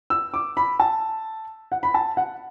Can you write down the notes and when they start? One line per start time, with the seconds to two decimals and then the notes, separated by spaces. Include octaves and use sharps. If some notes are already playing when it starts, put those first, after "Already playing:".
0.10 E6
0.34 D6
0.57 B5
0.80 A5
1.72 F#5
1.83 B5
1.94 A5
2.17 F#5